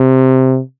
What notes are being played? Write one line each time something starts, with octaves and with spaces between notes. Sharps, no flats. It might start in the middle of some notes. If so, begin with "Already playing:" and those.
Already playing: C3